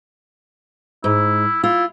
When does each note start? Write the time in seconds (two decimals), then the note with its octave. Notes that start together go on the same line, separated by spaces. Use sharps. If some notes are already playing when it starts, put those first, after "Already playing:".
1.04 G#2 E4
1.64 E4 F4